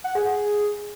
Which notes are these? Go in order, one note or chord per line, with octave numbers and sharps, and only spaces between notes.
F#5
G#4
G#4